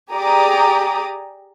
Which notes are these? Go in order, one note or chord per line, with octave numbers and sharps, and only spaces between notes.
G4 G#4 D5 A#5 D6 D#6